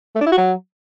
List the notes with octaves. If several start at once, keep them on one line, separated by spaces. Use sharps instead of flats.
A3
D4
E4
F#4
F#3